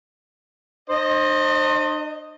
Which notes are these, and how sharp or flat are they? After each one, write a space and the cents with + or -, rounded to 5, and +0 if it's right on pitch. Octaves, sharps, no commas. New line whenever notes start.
D4 +45 C5 +25 D#5 +0